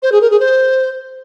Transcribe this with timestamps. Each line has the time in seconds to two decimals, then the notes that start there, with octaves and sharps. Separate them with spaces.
0.02 C5
0.12 G#4
0.21 A#4
0.30 G#4
0.39 C5